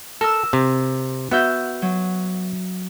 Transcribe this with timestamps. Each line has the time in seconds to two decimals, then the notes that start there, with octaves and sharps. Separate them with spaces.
0.21 A4 A#4 E6
0.53 C3
1.31 B3 F#4 E5 G6
1.82 F#3